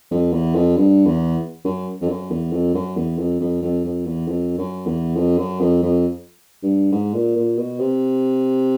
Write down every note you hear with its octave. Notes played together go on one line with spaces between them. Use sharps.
F2
E2
F2
G2
E2
F#2
F2
F#2
E2
F2
F#2
E2
F2
F2
F2
F2
E2
F2
F#2
E2
F2
F#2
F2
F2
G2
G#2
A#2
A#2
B2
C3